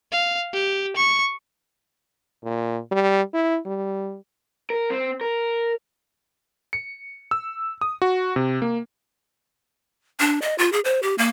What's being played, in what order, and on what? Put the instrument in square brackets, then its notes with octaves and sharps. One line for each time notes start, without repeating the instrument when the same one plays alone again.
[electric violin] F5
G4
C#6
[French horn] A#2
G3
E4
G3
[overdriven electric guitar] A#4
C4
A#4
[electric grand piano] C#7
E6
D#6
F#4
C3
A#3
[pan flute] D4
D#5
F4
G#4
C5
G4
A#3